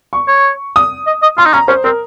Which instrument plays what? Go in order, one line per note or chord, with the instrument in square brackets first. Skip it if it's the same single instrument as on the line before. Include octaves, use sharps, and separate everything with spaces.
[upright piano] C#6
[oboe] C#5
[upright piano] D#6
[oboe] D#5
D#5
[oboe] F4 [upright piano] C6
[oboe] D#4
[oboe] C#4 [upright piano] A#5
[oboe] C#4 [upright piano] C5
[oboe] C4 [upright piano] A#4